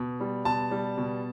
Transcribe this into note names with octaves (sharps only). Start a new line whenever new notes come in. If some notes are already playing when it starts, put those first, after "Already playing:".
Already playing: B2
G3
B2 A5
G3
B2